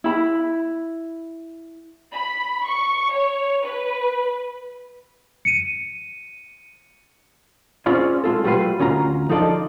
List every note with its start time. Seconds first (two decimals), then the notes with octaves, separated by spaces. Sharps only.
0.04 E4 B5
2.12 B5
2.65 C#6
3.12 C#5
3.63 B4
5.45 C#7 D#7
7.86 C4 C#4 F4 G#4 C#5 D5
8.24 G#3 F4 A4
8.44 F#3 G3 A3 F4 B4 C6
8.79 D2 C#4 F4 A#5
9.29 F3 D#4 F4 A4 D5 D#5